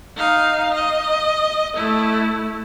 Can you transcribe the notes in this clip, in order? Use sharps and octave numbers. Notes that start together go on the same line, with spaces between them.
D#4 F5
D#5
A3 E4